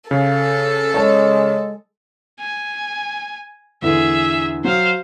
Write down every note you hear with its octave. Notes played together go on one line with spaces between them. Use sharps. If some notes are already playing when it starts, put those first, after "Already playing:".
C#3 A4 F5
G#3 C#5 A5
G#5
E2 A2 D3 G#4 E5
F#3 C5 F5